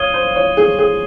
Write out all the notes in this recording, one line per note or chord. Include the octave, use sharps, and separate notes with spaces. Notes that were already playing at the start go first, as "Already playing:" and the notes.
Already playing: C#5 F5 D#6 G#6 D#7 G7
C5
C#5
G#4
G#4